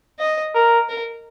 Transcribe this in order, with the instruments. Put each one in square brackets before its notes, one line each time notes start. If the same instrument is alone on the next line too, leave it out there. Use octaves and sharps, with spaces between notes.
[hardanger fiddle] D#5
[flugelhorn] A#4
[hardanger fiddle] A#4